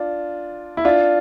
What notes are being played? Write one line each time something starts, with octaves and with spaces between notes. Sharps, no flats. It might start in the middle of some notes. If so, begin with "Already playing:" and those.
Already playing: D4 F4
E4
D4 F4